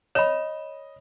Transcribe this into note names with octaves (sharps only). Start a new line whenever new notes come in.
C#5 D#5 B5 E7